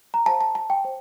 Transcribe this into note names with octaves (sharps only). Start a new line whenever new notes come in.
A#5
C5 F5 A5
A5
A5
G5
C5 G5